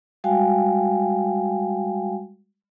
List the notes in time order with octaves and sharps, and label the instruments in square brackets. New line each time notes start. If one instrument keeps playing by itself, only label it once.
[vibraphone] G3 G#3 F#4 F5 G5 G#5